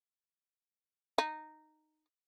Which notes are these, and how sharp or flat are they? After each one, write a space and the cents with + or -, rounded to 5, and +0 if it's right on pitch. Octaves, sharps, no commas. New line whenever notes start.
D#4 -10